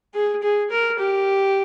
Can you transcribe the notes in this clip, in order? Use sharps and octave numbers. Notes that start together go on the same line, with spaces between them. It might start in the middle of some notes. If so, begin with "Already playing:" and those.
G#4
G#4
A#4
G4